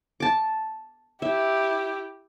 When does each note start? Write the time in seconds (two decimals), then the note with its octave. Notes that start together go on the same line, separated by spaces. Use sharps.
0.20 A5 D6
1.22 E4 G4 E5